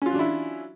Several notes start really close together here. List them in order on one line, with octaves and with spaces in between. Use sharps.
C#4 F4 F#3 D4 E4